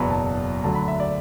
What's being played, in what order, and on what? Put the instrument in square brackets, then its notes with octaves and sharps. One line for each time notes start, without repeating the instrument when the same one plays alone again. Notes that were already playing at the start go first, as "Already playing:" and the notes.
Already playing: [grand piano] F#1 E2 B2 F#3 B5
A5
D2 D3 F#3 A5
B5
E5
D5